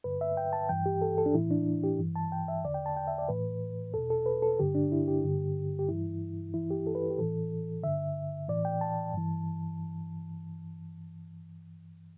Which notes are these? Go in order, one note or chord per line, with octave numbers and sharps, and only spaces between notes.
G2 D3 B4
E5
G5
A5
G2 E3 G5
G4
A4
A4
D4
A2 E3 E4
D4
G4
G2 E3
A5
G5
E5
E2 D3 D5
G5
A5
G5
E5
D5
A2 E3 B4
E2 B2 A4
A4
B4
A4
G2 D3 G4
D4
E4
G4
G2 D3
G4
G2 E3 E4
G2 E3 E4
G4
A4
B4
G4
A2 E3 A4
G2 D3 E5
A2 E3 D5
G5
A5
G2 E3